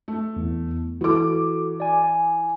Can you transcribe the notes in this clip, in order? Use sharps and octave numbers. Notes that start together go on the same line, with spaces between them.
A3
E2
E3 F#4 A4 D6
D5 G#5
G#5